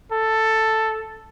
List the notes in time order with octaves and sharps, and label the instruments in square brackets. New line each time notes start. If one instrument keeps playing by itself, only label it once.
[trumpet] A4